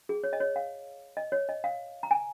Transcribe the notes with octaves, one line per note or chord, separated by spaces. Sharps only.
G#4
C#5
D#5
C#5
F5
D#5
C#5
D#5
F5
A#5
G#5